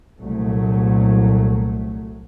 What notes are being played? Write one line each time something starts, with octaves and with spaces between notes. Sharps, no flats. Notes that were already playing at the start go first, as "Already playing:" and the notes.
C2 A#2 F#3 A3